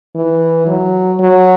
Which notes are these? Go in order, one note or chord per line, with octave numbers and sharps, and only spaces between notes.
E3
F#3
F#3